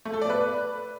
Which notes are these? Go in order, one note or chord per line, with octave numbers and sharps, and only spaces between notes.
A3
A4
D5
B4